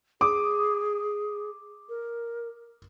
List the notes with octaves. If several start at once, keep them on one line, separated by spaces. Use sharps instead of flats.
G#4 D6 D#6
A#4